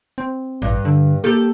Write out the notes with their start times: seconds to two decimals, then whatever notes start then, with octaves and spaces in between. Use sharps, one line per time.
0.18 C4
0.62 A1 G2
0.85 D3
1.24 A#3 G4 A4